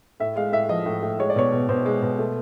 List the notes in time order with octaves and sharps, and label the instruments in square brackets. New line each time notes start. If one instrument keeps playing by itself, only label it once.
[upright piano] A2 E5
G#3 F5
A2 E5
F3 D#5
A2
A2
G#3 C#5
D5
B2 C#5
B2
B2 C5
G#3
B2
A3